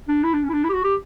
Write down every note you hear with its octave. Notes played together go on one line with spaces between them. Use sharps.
D4
E4
D4
C#4
E4
D4
E4
G4
F#4
G4